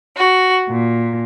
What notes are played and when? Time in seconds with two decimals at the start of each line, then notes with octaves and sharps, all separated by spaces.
0.18 F#4
0.68 A#2